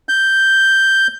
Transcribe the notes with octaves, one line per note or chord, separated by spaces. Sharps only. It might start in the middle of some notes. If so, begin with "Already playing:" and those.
G6